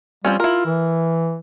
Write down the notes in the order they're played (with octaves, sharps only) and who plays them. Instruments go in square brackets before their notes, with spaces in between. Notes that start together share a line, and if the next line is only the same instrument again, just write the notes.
[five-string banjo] F3 C4 C#4 [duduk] G3
[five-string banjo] E4 A#4 [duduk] F4
[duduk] E3